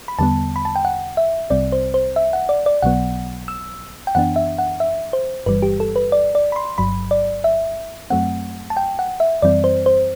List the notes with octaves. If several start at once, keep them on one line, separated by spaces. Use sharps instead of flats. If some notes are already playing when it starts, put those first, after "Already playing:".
B5
E2 D3 G3 B3 A5
B5
A5
G5
F#5
E5
C2 C3 G3 C4 D5
C5
C5
E5
F#5
D5
D5
B1 B2 F#3 B3 F#5
E6
G5
F#2 E3 B3 D4 F#5
E5
F#5
E5
C5
G1 G2 E3 G3 B4
G4
A4
B4
D5
D5
B5
C6
G1 G2 F#3 B5
D5
E5
F#2 F#3 A3 C4 F#5
A5
G5
F#5
E5
F#2 E3 G3 C4 D5
C5
C5